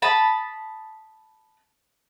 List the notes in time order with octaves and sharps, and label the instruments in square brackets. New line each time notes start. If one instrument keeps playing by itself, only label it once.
[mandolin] A5 B5 D#6